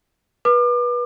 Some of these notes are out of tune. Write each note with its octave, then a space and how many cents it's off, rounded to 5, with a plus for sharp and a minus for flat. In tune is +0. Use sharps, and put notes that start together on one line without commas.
B4 -25 D6 +40